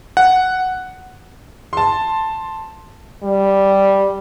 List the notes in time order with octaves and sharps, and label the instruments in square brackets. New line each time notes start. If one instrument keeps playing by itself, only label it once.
[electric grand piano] F#5
[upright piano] A5 C6
[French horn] G3